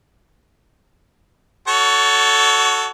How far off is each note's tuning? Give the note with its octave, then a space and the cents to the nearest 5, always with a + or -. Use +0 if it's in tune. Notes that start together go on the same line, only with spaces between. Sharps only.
F#4 +0 A4 +0 C#5 +25